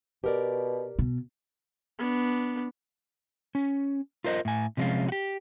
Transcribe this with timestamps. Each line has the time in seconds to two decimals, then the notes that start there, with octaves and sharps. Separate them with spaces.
0.24 B2 G4 A#4 D5
0.99 B2
1.99 B3 D4
3.55 C#4
4.24 F4 A#4 C5 D#5
4.45 A2 G#5
4.77 C3 F3 G#3 C#4 F4
5.08 F#4 G4